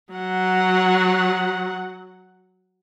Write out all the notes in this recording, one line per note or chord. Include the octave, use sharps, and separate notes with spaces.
F#3 F#5